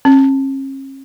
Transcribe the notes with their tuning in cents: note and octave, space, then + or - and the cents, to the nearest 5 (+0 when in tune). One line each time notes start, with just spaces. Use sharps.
C#4 -45